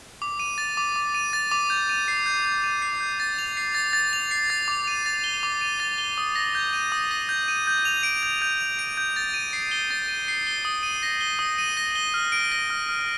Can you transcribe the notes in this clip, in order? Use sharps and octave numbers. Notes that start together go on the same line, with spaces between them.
D6
D#7
A6
D6
D6
D#7
A6
D6
G6
D#7
C7
G6
G6
D#7
C7
G6
A6
F7
C7
A6
A6
F7
C7
A6
D6
D#7
A6
G7
D6
D#7
A6
G7
D#6
A#6
G6
D#7
D#6
A#6
G6
D#7
G6
F7
D7
G6
G6
F7
D7
G6
A6
D#7
C7
G7
A6
D#7
C7
G7
D#6
D#7
A#6
G7
D#6
D#7
A#6
G7
F6
D7
A#6
F6
F6